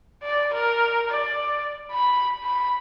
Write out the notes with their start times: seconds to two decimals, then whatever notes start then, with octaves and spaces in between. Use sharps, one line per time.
0.23 D5
0.53 A#4
1.10 D5
1.91 B5
2.43 B5